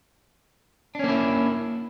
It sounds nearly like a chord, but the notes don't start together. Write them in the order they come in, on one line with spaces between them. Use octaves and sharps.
D4 C#4 A#3 E4